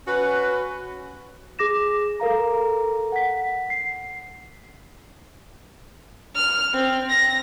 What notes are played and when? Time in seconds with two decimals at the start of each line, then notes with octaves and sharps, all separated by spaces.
0.08 C#4 F#4 B4
1.59 G#4 D6 A#6 E7
2.20 A4 A#4 F5 A#5
3.12 F#5 B6
3.70 C7
6.35 F6
6.74 C4
7.09 A#6